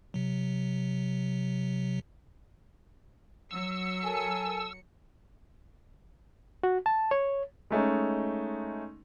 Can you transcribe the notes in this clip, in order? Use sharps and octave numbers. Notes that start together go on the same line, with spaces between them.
C3 F#3
F#3 E6 C#7
A4 A#4 G#5
F#4
A5
C#5
G#3 A3 C#4 D#4